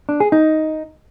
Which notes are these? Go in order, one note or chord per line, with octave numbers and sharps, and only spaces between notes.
D4
G#4
D#4